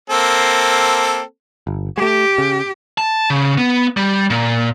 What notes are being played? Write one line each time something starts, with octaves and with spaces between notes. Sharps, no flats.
A#3 C4 A4
G1
G#3 A3 G4
C#3
A5
C#3
B3
G3
A#2